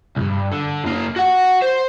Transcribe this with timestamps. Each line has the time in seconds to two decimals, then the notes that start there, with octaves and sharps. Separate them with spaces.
0.16 C2 G2
0.52 D3
0.84 F#2 A#3
1.16 F#4 F#5
1.62 C5